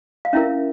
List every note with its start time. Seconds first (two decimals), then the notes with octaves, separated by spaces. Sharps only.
0.25 F5
0.33 C#4 E4 A#4 E5